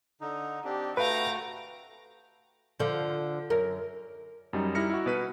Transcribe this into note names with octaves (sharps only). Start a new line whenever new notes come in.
D3 D#4
C4 D4 G4
A3 F#4 B4 F5 G5 A#5
D3 F3
F#2 A#4
F#2 G3 D#4
G3 D#4 E4 F6 A#6 C#7
E4 F#4
B2 B4 D#7